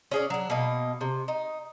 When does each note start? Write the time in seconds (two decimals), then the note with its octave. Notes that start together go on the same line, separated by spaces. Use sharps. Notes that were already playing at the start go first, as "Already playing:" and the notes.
0.11 C#4 G#4 D5
0.30 F#3 D4
0.50 B2 A#3 D#4
1.01 C3
1.28 D#4